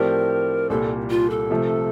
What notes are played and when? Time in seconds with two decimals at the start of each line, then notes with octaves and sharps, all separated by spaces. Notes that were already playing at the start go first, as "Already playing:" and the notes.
Already playing: A2 F3 C4 G4 A#4 D5
0.70 C2 A#2 G3 A4
1.10 F4
1.30 A4
1.50 C3 F3 A3